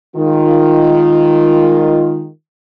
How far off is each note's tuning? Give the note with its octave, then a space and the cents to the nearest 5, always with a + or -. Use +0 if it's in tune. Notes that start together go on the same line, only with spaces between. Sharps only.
D#3 -5 G#3 +0 F4 +0